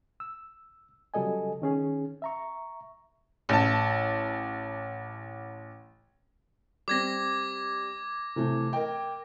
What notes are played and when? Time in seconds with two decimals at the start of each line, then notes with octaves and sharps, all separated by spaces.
0.20 E6
1.14 C#3 F#3 G3 A4 D#5 G#5
1.62 D#3 C#4 G#4
2.22 E5 A#5 C#6
3.49 A1 A5
6.88 G3 C4 D6 G#6 A#6
8.36 C3 E3 A3
8.73 A#4 D#5 G5